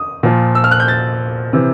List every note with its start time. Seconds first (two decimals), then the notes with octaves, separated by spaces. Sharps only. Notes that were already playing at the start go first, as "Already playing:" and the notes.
Already playing: D#6
0.23 A#2 F3
0.55 E6
0.64 F6
0.71 F#6
0.80 G6
0.88 A6
1.53 C3 E3